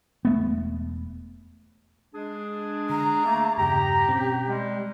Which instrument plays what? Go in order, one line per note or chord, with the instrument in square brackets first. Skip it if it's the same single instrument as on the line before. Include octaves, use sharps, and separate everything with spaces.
[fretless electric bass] E1 A3 B3
[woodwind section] G#3 D4 G#4
[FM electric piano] D3 [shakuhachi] A#5
[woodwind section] A3 A#3 [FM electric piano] E6
[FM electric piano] E2 G2 C#3 [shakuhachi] G4 [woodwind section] A#5
[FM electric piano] B2 C4 C#4
[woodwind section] G3 G#3